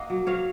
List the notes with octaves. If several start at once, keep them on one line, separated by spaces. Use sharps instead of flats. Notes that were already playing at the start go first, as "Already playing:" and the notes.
Already playing: A#3 D#5 F#5
F#3
F#3 C#5 F5